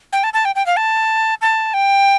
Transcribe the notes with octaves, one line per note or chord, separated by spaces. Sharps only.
G5
A5
A5
G5
G5
F5
A5
A5
G5